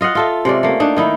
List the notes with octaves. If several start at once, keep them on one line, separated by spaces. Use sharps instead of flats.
F4 D#5 F5 F#5
F4 A4 E5
C3 G#3 C#4 D5
A3 A#3
D4 D#4
D#3 D#4 E4